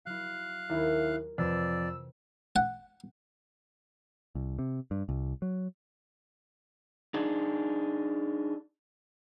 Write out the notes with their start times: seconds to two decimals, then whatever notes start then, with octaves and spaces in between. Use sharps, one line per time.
0.06 F#3 E4 F5 F#6
0.69 D#2 E4 A#4
1.38 F2 C3 E3 B4 D5 E6
2.56 F#5
4.35 C2
4.59 C3
4.91 G2
5.09 C2
5.42 F#3
7.14 D4 D#4 G#4